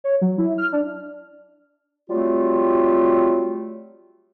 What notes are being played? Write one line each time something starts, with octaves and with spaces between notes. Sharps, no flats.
C#5
F#3
E4
F6
D4
F#3 G3 A3 C4 F4 G4